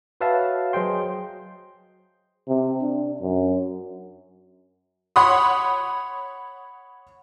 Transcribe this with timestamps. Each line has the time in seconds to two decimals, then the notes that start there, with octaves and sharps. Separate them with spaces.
0.21 F#4 B4 C#5 E5 F5 A5
0.73 F#3 G#4 C5 D#5 G5 C6
2.48 C3
2.81 D4
3.21 F#2
5.16 C#5 F#5 B5 C6 D#6